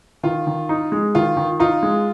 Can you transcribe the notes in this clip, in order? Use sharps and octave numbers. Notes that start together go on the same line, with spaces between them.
D#3 F4
D#3
D#4
G#3
D#3 F4
D#3
D#4 F4
G#3